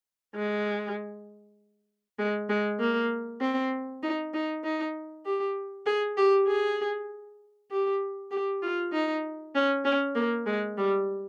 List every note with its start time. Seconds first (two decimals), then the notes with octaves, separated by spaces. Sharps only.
0.35 G#3
2.19 G#3
2.49 G#3
2.80 A#3
3.41 C4
4.03 D#4
4.34 D#4
4.64 D#4
5.25 G4
5.86 G#4
6.17 G4
6.48 G#4
7.71 G4
8.31 G4
8.62 F4
8.93 D#4
9.55 C#4
9.85 C#4
10.15 A#3
10.46 G#3
10.78 G3